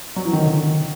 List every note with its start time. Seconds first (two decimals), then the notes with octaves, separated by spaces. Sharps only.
0.17 F#3
0.25 E3
0.33 D#3
0.46 D3
0.57 D#3